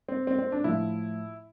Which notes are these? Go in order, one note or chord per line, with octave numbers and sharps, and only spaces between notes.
C4
C4
C4
D4
A2 F3 E4